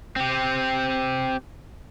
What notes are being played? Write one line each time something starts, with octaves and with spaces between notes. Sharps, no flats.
C4 G4